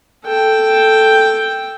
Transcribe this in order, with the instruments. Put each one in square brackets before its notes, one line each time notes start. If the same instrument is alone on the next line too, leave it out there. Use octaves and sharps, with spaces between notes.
[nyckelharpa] A4 G5